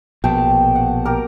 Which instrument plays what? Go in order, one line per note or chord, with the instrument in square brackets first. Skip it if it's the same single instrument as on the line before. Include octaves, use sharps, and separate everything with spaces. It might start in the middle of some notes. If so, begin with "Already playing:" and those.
[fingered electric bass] A#1 B2 [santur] G5 A5
[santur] F#5
G4 A#4